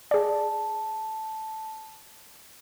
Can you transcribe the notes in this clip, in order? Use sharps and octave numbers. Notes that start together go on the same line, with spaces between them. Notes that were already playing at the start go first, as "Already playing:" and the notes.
G#4 D5 A5